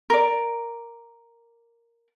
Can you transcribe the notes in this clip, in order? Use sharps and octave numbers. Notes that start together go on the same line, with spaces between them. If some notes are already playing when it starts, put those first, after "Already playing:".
A#4 D5